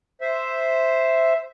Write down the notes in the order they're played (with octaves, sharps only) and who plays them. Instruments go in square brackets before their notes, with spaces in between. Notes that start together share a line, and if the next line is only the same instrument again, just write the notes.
[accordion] C5 E5